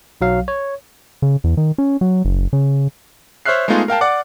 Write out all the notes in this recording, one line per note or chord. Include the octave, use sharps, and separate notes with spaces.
B1 F#3 F5
C#5
C#3
E2
D#3
C#4
F#3
F#1
C#3
C5 C#5 E5 F6 F#6 C7
G#3 A3 B3 D#4 F4 G#4
A#4 F5 G5 A5
D5 F#5 D6